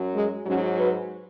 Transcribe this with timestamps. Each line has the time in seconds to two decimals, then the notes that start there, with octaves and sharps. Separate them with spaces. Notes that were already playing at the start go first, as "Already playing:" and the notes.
Already playing: F#2 F#3
0.15 G#3
0.46 G#2 F#3 C#4 F#4
0.78 F#4 B4